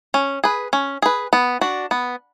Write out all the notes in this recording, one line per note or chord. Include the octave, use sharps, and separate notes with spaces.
C#4
G#4 B4
C#4
G#4 B4
B3
D4 F#4
B3